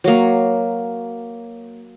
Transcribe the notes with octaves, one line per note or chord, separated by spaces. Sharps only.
F#3 A#3